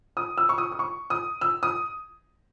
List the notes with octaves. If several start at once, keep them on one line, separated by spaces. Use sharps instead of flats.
D#6
E6
C#6
D#6
D#6
C#6
D#6
E6
D#6